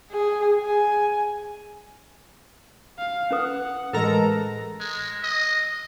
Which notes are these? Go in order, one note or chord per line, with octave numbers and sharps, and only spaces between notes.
G#4
G#5
F5
C#4 B4 F#5 D#6
A2 E3 G#3 A4 A#4 A#5
G#3
D#5